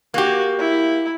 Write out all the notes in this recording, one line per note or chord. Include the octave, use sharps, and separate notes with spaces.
A#3 F#4 G4
E4